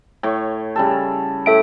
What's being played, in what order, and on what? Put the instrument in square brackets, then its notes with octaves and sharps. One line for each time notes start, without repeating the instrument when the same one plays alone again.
[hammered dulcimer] A2 C#5
C#3 G3 A4
[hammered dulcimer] A2 [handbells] A4 E5 D7